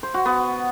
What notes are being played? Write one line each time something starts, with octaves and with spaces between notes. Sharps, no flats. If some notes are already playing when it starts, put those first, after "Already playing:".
C5
F#4
B3